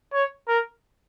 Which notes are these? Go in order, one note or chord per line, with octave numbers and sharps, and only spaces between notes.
C#5
A#4